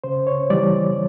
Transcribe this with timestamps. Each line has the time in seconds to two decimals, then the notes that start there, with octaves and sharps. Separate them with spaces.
0.04 C#3 C5
0.27 C#5
0.50 E3 G3 D5